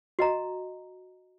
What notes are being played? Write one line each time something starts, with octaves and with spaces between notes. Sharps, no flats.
F#4 D#5 A#5